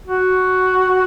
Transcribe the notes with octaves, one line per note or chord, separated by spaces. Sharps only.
F#4